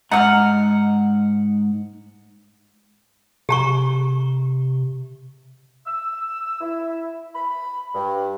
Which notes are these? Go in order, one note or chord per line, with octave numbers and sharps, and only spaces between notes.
G#2 D#5 F#5 A#5 F6
C3 G4 A#5 C#6
E6
E4
B5
G2